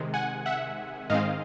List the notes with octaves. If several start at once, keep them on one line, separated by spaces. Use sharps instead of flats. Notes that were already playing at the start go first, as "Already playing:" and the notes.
Already playing: C3 D#3 G#3
F#5 G#5
E5 F#5
G#2 D#3 G#3 C4 D#5 F5